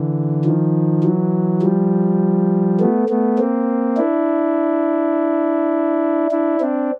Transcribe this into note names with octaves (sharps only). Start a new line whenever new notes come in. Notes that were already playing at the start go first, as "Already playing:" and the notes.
Already playing: D3 E3
D#3 F3
E3 F#3
F3 G3
A3 B3
A3 B3
A#3 C4
D4 E4
D4 E4
C4 D4